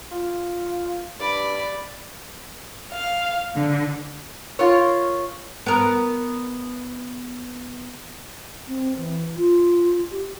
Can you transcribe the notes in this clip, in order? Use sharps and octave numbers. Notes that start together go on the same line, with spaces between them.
F4
G2 D5 B5
F5
D3
F4 A#4 C#5
B3 A#4
C4
E3
F4
G4